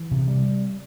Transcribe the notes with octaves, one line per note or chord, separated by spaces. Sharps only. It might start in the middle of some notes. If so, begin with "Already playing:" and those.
Already playing: E3
C3
G3